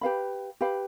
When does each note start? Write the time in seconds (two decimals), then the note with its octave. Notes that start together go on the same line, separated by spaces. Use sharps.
0.01 G4 B4 F5 B5
0.61 G4 B4 F5 B5